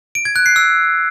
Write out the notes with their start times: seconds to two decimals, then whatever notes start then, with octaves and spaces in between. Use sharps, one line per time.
0.15 D7
0.25 G#6
0.36 F#6
0.46 C7
0.56 E6